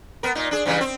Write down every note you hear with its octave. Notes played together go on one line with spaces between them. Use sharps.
B3 A#4
A#2 D#4
D4 G#4
G2 C#3 E3
C4